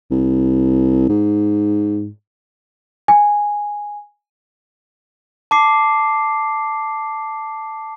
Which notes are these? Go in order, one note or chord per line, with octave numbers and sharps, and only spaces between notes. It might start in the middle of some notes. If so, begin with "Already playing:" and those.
C2
G#2
G#5
A5 D6 C7